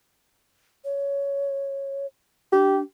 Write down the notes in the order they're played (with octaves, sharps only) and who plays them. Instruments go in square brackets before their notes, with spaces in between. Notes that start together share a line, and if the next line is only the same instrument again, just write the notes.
[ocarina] C#5
[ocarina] D4 [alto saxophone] G4